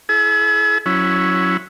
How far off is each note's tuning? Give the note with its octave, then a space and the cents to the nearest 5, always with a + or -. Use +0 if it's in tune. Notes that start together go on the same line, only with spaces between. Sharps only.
E4 +0 G#4 +40
F#3 -15 C#4 +0 E4 +0